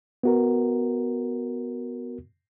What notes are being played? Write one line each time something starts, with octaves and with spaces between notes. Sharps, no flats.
B3 F#4 A#4